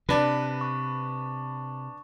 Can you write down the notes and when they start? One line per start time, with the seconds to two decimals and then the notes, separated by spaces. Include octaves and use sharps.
0.09 C3 D4 B4
0.61 C#6